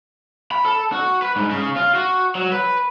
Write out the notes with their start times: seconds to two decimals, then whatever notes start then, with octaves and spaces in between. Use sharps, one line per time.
0.51 B5
0.65 A4
0.92 F#4
1.22 B4
1.36 G#2
1.51 C#3
1.76 F4
1.95 F#4
2.35 F#3
2.52 B4